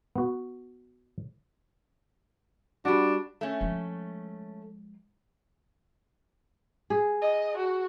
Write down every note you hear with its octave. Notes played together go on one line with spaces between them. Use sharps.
B3 F#4
G3 D4 F#4
A3 C#4
F3 G#3
G#4
D#5
F#4